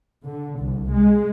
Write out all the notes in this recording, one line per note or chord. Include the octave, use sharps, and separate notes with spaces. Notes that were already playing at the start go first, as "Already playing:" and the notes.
D3
C2
G#3